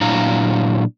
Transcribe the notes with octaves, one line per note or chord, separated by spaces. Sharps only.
A#2 F#3 D4 E4 F5 A#5